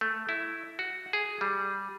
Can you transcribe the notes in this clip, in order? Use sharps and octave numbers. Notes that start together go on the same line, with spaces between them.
A3
E4
F#4
G#4
G3